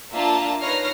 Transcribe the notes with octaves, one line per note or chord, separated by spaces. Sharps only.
A#3 D4 F4 E5 A5 A#5
D#4 B4 C#5 F6 A#6 C7